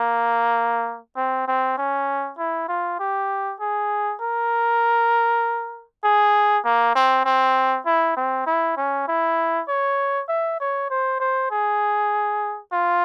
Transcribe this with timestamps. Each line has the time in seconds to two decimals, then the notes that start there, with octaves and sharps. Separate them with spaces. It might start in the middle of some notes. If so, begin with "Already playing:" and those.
Already playing: A#3
1.17 C4
1.48 C4
1.78 C#4
2.38 E4
2.69 F4
2.99 G4
3.61 G#4
4.21 A#4
6.04 G#4
6.65 A#3
6.95 C4
7.25 C4
7.86 E4
8.17 C4
8.47 E4
8.77 C#4
9.08 E4
9.68 C#5
10.29 E5
10.60 C#5
10.91 C5
11.20 C5
11.51 G#4
12.72 F4